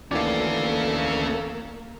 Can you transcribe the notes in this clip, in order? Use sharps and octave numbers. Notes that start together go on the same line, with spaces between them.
D2 D#3 E3 A#3 C#4 A4 D5 F5